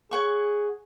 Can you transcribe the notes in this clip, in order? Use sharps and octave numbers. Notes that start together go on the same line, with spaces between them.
G#4 C#5 F#5 C#6